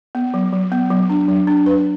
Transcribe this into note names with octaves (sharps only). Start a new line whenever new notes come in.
B3
F#3
F#3
B3
F#3
D4
F#3
D4
B4